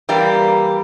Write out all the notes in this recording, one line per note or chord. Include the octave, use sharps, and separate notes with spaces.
E3 G3 A#3